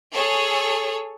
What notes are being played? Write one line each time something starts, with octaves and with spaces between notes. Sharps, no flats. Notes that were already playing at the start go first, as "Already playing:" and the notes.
G#4 A4 C#5